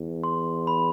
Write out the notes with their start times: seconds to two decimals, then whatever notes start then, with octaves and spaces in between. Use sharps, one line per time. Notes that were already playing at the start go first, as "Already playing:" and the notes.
Already playing: E2
0.24 C6
0.67 B5